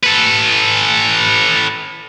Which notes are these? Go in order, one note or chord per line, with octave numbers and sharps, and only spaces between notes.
A4 B4